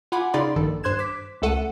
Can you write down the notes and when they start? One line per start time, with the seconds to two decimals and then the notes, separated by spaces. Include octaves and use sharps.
0.12 F4 F#5 G#5 B5 D6
0.34 C#3 D#4 D5 B5 C6
0.56 A#1 G2 D#3 A4
0.83 G2 C5 C6 F#6 G#6 E7
0.99 D6 B6
1.42 C#2 A3 A4 F#5 C#7 D#7